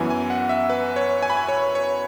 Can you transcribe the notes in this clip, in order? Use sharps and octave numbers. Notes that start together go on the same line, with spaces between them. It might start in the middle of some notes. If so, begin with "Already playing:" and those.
Already playing: F#2 E3 B3 G#5
G#5
F#5
E5
B4
C#5
G#5
B5
G#5
C#5
C#5